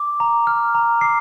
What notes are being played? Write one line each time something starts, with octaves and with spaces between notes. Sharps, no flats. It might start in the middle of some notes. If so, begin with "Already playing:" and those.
Already playing: D6
A#5
F6
A#5
D6 C7